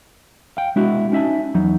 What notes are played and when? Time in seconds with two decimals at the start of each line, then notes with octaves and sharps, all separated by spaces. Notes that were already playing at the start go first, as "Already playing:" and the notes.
0.57 F5 G5
0.76 G#3 D4 E4 F#4
1.12 C#4 D#4 E5 G#5 A5
1.54 E2 F#3 D#4